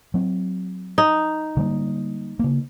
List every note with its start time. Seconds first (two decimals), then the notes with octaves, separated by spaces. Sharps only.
0.14 F#3 C4
0.98 D#4
1.57 D3 G3 A#3
2.39 C#3 A#3